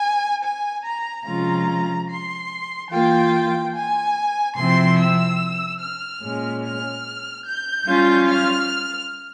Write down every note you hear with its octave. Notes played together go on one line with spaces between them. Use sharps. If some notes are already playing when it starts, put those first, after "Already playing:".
Already playing: G#5
G#5
A#5
C3 F3 G#3 C#4 F4 A#5
C6
E3 A#3 F4 G5
G#5
C3 F3 C4 E4 C6
E6
F6
A#2 G#3 C#4
F6
G6
G3 C#4 F4
F6